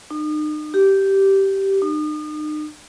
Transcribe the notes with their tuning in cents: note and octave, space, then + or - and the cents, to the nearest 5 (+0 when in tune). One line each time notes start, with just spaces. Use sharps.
D#4 -40
G4 -10
D#4 -40